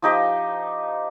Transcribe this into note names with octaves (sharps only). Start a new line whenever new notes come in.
F3 D#4 G4 D#5